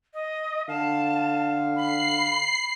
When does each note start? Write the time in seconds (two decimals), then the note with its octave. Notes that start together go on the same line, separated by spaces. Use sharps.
0.14 D#5
0.69 D3 F5 A5
1.76 B5 C7